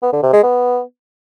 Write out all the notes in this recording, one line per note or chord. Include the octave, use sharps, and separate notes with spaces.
B3
D3
C3
G#3
B3